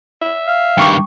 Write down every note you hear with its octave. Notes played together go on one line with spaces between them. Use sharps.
E5
F5
G2 D#3 G5 C#6 D6